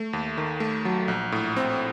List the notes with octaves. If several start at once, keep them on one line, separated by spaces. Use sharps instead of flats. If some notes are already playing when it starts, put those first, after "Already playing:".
Already playing: A3
D#2
D#3
A3
F#3
A#1
A2
C4